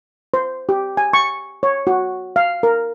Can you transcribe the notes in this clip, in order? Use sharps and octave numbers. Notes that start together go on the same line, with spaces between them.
C5
G4
G#5
C#6
C#5
F#4
F5
A#4